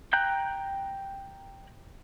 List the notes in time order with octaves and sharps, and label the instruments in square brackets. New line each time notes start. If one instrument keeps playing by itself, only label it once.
[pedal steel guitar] G5 A#5 F#6 G6